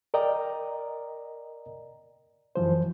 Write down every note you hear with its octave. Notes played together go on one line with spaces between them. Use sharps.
A#4 D5 D#5 G5 A#5
F#2 E3 F3 C5